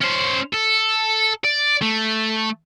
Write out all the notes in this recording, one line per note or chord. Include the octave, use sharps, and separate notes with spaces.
C#4 C5
A4
D5
A3